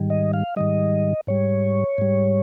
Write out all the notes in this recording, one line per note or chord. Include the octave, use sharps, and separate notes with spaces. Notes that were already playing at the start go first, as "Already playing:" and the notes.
Already playing: G#2 D#3 G3
D#5
F5
G#2 D#3 G3 D#5
G#2 G3 C#5
G#2 G3